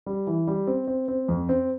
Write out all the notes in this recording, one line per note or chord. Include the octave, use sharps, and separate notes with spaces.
G3
E3
G3
C4
C4
C4
F2
C4